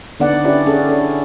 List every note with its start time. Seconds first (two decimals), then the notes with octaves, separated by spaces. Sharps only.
0.20 D3 B3 D4 D#4 D5 F#5
0.44 C#4 D4 E4 G4 D5
0.66 C#4 G#4 A4
0.89 D4 A4